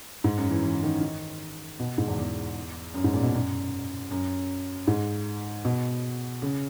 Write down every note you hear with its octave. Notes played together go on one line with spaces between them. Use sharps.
G#2
F#2
E3
E3
D#3
D#3
B2
G#2
E2
E2
F#2
G#2
A#2
B2
F#2
F#2
G#2
B2
C#3